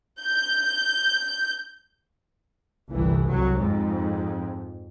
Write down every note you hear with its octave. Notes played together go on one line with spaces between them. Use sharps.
G6
G1 C2 E3
C2 F#3
F2 G#2